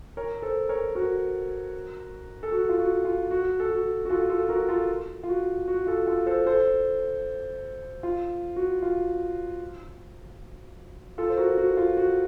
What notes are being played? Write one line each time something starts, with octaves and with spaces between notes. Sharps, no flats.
A#4 C#5
A4 C5
A#4 C#5
F#4 A#4
A4
F#4
F4
F#4
F4
F#4
A4
F#4
F#4
F4 A4
F4 A4
F#4 A#4
F4 A4
F4
F#4
F#4
F4 A4
F4 A4
A4 C5
A4 C5
F4
F#4
F4
F4 A4
C5
F#4 A#4
F#4
F4
F#4